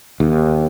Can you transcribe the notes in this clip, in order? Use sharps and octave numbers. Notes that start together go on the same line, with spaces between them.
D#2